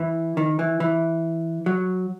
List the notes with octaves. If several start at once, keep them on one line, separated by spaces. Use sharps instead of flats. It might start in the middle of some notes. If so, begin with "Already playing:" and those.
Already playing: E3
D#3
E3
E3
F#3